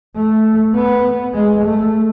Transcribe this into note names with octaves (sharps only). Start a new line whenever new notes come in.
A3
B3
G#3
A3